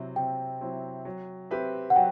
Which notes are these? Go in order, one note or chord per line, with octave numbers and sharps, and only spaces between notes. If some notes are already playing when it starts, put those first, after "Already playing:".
Already playing: C3 F#3 C4 E4
C3 G5
F#3 C4 E4
F#3
C4 G4 B4 E5
F#5
F#3 G5